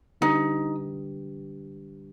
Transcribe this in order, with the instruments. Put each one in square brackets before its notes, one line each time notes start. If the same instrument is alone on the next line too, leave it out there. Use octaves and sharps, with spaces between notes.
[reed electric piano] D3 G3 D4 G4 B4 [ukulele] D#4